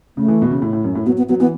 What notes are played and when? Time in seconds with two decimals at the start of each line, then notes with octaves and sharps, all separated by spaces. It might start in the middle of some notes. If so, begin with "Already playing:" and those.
0.17 C#3 A3
0.28 E3
0.42 B2
0.51 C#3
0.62 A2
0.73 A2
0.84 F#2
0.95 A2
1.06 F#3 B3
1.18 B3
1.29 F#3 B3
1.40 E3 B3